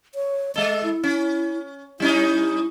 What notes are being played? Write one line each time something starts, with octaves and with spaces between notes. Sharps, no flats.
C#5
G#3 A4 D#5
E4
C#4
G3 C#4 D#4 E4